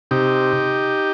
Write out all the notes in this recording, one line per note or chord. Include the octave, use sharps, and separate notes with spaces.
C3 D#4 G4